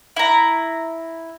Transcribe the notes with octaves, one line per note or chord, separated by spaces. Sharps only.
E4 A#5